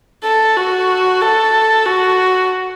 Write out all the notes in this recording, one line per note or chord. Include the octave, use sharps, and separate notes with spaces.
A4
F#4
A4
F#4